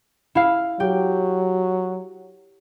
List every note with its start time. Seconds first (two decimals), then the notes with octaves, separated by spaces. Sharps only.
0.35 E4 F5
0.80 F#3 G4